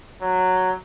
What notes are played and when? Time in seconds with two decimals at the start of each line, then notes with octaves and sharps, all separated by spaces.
0.22 F#3